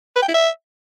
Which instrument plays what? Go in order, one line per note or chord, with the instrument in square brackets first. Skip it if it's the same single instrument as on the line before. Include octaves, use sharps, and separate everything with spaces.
[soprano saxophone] B4
G5
E4
E5